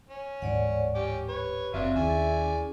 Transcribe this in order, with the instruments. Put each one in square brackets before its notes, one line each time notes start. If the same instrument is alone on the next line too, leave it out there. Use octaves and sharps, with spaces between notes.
[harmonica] C#4
[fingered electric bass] D1 G#2 E3 [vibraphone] C#5 D5 F#5
[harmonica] C#4 G5 D6 [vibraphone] G4
[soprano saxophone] B4 [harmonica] C#5
[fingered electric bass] F#1 [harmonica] F#3 D4 F4 [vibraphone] C4 [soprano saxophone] E5
[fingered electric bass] D#2 [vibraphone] C#4 E4 G#4 [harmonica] D5 G#5